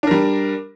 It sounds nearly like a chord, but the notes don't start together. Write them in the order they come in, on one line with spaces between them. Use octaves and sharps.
D4 A#4 G3